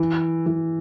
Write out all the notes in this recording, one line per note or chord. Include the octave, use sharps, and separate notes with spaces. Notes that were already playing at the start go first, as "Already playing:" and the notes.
Already playing: E3
E3